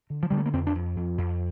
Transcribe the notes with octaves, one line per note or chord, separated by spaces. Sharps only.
D3
F3
D3 G3
A3
A#3
F2 C4
D4
F2
F2
F2